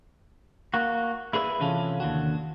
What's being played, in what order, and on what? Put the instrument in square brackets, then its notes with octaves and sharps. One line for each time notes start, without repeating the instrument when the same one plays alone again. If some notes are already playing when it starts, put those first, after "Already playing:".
[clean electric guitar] A#3 F#4
E4 G#4 B4 C5 E5
C3 E3 C#4 F4 A4
D#2 D3 F#4